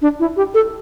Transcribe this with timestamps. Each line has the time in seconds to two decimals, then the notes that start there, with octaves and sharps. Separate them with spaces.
0.02 D4
0.19 E4
0.37 G4
0.54 A4